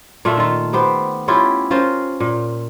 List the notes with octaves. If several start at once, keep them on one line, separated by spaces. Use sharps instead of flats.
A#2 A3 F4 E5
D#3 F4
B3 G4 C5
C#4 E4 F4 G4
C#4 F4 A#4 C5
A#2